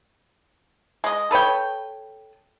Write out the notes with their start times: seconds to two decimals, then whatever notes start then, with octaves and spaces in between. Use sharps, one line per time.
1.04 G#3 D#5
1.31 A4 B4 C#5 G5